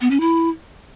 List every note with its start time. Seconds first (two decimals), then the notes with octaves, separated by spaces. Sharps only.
0.01 B3
0.11 C#4
0.20 E4